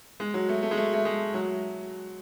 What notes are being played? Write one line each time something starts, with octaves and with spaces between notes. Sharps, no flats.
G#3
F#3
A3
A3
G#3
A3
A3
G#3
F#3